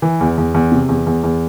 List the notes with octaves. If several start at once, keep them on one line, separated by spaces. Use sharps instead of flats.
E3
E2
E2
E2
C3
E2
E2
E2